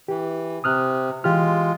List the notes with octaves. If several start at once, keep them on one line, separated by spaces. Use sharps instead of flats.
E3 G4
C3 D#6 F6 F#6
E3 G#3 F4 G4 F6